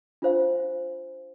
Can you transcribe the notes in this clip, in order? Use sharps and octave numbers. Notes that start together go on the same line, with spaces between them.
D4 F4 C5 F5